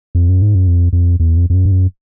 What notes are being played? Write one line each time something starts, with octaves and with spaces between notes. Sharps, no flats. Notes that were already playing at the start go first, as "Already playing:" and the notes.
F2
F#2
G#2
F#2
F2
F2
E2
F2
F2
F#2
G2
F#2